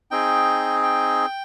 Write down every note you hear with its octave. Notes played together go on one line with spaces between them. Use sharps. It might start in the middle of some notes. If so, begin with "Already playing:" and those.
C4 D#4 G#4 G5
G5